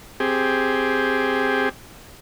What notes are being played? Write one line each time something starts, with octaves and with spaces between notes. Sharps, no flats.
C4 G4 G#4